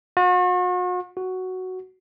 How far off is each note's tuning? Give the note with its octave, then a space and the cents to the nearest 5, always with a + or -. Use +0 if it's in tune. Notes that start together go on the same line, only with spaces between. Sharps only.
F#4 -40
F#4 +5